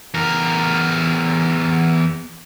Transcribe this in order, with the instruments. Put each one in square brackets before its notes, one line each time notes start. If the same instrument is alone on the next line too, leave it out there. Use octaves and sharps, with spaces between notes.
[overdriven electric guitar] E2 A#4